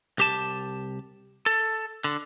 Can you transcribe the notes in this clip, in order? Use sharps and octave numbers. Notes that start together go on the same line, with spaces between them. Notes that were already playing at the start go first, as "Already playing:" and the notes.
C2 G4 A5
A4
D3